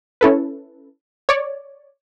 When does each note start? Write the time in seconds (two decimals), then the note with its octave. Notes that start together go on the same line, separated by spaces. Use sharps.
0.21 C#4 E4 A4 B4
1.29 C#5 D5